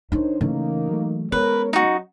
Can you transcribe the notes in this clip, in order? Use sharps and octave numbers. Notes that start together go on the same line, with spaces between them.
D#3 D4 D#4 C5 C#5
C#3 E3 A3 A#3 C#4 D#4
F#3 A3
G#3 B3 C#4 A#4 B4 C#5
F#3 D#4 F#4 D#5